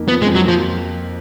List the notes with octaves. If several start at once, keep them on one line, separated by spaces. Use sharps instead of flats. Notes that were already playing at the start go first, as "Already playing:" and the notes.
Already playing: F2 A#3 D#4
F3 B3
G#3
F2
F#3
F3 A#3